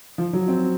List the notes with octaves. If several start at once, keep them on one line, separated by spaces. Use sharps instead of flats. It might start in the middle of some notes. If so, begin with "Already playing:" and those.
F3
F#3
C4